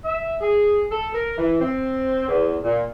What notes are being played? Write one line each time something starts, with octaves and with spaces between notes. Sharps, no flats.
E5
G#4
A4
A#4
E3
C4
E2
A#2